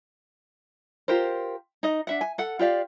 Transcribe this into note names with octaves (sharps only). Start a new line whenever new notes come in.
F4 G4 A#4 C5
D#4 D#5
D4 E5 F#5
G#5
A4 F#5
F4 G4 D5 F5